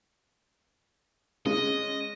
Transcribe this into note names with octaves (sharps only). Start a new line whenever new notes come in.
G#3 C#4 D#5